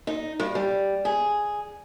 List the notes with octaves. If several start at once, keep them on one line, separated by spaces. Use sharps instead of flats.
D#4
G2
G3
G#4